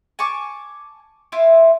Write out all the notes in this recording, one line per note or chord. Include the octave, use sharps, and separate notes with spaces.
G#5 A5 C#6 D6
E4 F4 E5